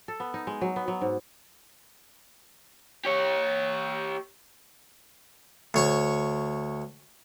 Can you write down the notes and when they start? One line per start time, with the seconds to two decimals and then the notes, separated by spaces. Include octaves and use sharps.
0.08 A4
0.20 B3
0.34 D#4
0.47 G#3
0.61 F#3
0.76 B3
0.88 F#3
1.01 G#2
3.05 G4 C#5
5.74 D2 C#5 C#6